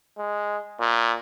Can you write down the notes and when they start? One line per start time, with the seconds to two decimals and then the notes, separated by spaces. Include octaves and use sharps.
0.18 G#3
0.80 A#2